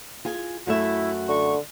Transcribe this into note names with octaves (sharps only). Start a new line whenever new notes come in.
F4 G#4 G#5
F#2 A3 E4 F#4 E5
D3 C#6